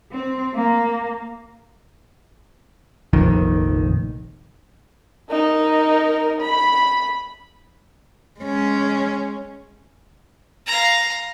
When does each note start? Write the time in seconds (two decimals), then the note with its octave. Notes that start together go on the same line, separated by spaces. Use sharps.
0.12 C4
0.54 A#3
3.13 F1 A#1 F2 D#3
5.30 D#4 A#4
6.41 B5
8.40 G#3 C#4
10.66 F5 A#5